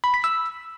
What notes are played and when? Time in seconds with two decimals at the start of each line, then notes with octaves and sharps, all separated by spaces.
0.04 B5
0.14 B6
0.24 E6